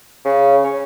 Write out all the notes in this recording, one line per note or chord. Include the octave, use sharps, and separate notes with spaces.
C#3
C#4